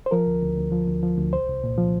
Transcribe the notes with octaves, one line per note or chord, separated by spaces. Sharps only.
C5
F3 A#4
D2
D2
D2
F3
D2
F3
D2
C2 C5
C2
A#2
F3